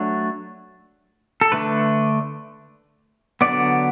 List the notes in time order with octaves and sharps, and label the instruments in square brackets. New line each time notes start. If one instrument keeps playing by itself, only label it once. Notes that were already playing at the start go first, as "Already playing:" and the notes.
Already playing: [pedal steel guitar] F#3 A3 D4
A4
D3 A3 D4 B4
D3 F#3 B3 D5